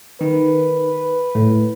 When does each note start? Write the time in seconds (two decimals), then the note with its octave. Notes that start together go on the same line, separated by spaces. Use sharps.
0.21 D#3 B4
1.35 A2